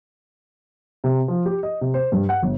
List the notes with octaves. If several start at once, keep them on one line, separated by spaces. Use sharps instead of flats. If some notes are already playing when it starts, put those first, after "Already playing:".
C3
F3
G4
D#5
C3
C5
G2
F#5
G1